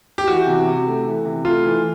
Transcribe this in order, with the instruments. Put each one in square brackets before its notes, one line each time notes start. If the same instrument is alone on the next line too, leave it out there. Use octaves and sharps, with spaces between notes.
[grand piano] G4
[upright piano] E3 [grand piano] F#4
[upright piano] C3
C3
A3
E3
C3
[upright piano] A3 [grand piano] F4
[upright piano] E3